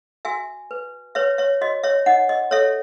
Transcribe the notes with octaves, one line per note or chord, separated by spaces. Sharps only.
F#4 E5 G#5
B4
B4 C#5 E5
C#5 E5
F#4 D#5
C#5 E5
D#4 D#5 F#5
D#5
A4 C#5 E5